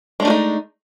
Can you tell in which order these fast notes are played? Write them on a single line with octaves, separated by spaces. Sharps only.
G#3 D4 A3 F#4 D#4